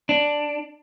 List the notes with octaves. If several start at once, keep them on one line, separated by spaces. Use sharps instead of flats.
D4